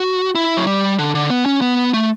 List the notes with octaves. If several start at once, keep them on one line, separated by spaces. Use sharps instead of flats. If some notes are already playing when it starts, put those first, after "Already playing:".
Already playing: F#4
E4
F#3
G3
D3
D3
B3
C#4
B3
A3